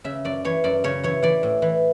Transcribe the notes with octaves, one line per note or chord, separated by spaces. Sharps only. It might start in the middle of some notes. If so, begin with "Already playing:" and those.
C#3 E5
F#2 D5
E3 C#5
F#2 D5
C#3 C#5
E3 C#5
E3 D5
A2
E3